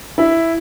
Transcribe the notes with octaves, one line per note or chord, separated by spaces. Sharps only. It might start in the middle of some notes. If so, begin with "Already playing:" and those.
E4